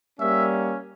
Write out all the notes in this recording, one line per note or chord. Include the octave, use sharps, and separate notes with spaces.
G3 A#3 C#4 E5